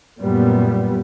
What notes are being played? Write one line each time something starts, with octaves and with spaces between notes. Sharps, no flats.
F#2 A#2 G3 B3